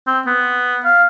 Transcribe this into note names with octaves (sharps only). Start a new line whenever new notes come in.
C4
B3
F5